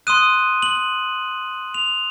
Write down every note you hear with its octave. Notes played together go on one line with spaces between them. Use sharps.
C6 D#6 F#6 D#7
F#7
F7